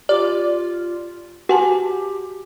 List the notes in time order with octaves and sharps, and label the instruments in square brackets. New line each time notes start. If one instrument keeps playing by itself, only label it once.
[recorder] F4 [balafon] G4 [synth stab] D5
[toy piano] F#4 [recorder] G4 [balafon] F#5 G#5 A5